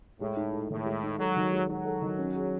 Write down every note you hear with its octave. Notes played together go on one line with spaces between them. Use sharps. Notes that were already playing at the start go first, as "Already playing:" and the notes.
A2 G#3
D#4
A4
A2 D#3
G#3
D#4
F#3 A4
D#3
G#3
F#3 D#4
A4
D#3
C#4
G#4